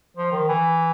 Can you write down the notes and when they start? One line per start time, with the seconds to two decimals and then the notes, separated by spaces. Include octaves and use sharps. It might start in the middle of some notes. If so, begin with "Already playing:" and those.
0.17 F3
0.32 D#3
0.48 E3